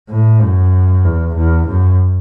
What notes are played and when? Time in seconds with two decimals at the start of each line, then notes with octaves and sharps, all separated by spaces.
0.10 A2
0.42 F#2
1.05 E2
1.36 E2
1.68 F#2